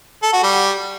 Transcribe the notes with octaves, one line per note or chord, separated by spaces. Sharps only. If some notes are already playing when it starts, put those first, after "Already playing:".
A4
F#4
G3